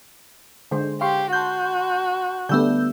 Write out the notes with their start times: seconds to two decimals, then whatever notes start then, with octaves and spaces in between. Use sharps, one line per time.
0.71 D3 G#3 C5
1.01 G4 F5 C6 C#6
1.33 F#4 A5 C6 G6
2.49 D3 G3 A3 B3 E6 G6